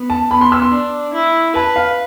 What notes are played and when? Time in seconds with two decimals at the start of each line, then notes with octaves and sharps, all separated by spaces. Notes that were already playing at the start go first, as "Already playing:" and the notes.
Already playing: B3
0.10 A5
0.31 B3 B5
0.41 C6
0.52 E6
0.62 C6
0.72 D4
1.14 E4
1.55 B4 A5
1.76 F5